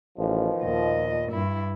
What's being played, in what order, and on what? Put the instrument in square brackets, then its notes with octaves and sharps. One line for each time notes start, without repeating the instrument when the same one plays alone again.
[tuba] A1 [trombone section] B2 D#3 F3
[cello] D#2 D#5 [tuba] A#2
[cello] G2 E4